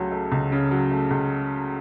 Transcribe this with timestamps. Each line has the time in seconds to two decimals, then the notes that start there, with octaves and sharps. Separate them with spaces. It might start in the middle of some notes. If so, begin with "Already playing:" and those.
Already playing: C#2 C#3 F#3 A3
0.11 A3
0.32 C#2
0.52 C#3
0.71 F#3
0.91 A3
1.11 C#2